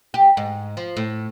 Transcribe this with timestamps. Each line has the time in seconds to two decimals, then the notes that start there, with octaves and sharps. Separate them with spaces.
0.14 G4
0.37 G#2
0.77 F3
0.97 A2